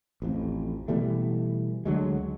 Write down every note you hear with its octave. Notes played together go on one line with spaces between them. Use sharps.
A1 F2
B2 E3 G3 A3
D2 D3 F#3 G#3